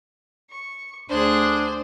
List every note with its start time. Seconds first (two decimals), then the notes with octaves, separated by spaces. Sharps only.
0.49 C#6
1.09 D2 D4 G#4 C5 F#6